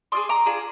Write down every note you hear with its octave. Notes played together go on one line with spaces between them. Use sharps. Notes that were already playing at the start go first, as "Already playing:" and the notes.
D4 F4 G#4 C6 D#6
A#5 D6
D4 F4 G#4